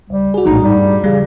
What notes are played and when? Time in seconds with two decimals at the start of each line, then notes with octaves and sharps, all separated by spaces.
0.10 C#2 G3
0.34 F#4 G#4
0.45 A#1 A2 D#4
0.62 G2 G3
1.04 C#3 E3 G3